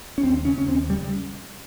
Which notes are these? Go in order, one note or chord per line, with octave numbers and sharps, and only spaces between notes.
C#4
D#2 C4
C#3 C#4
C#4
D#2 C4
C#3 G3